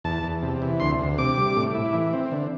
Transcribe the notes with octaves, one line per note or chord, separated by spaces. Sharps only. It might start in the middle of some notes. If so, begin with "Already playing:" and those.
E2 A5
E2
C3
E3
D2 C6
D2
C3 D6
G3
A2
E4
E3
C4
D3